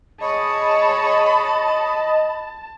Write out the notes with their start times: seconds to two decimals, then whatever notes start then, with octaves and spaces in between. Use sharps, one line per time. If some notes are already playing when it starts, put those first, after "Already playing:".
0.21 G#4 C#5 D#5 A5 B5